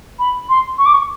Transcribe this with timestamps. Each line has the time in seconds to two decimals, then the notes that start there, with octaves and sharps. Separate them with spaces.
0.19 B5
0.49 C6
0.78 C#6
0.86 D6
0.94 C#6